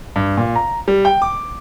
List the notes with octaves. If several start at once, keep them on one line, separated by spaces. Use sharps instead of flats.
G2
A#2
A#5
G3
G5
D6